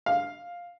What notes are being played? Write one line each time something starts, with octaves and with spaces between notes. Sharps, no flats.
F5